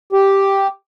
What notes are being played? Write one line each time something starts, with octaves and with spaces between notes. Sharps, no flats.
G4